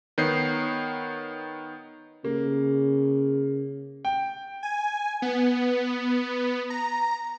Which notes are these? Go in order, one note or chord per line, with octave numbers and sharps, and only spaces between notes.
D#3 B3 C#5 G6 C7
C#3 A#3
G5
G#5
B3
A#5